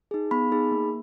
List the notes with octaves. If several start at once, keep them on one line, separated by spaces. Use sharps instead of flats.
D#4 G#4
B3 B5
D#4 G#4
A#3